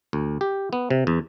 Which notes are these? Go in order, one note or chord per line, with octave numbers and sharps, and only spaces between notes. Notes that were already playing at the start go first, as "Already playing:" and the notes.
D2
G4
B3
C3
E2